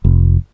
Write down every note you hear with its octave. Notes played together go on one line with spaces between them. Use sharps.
F1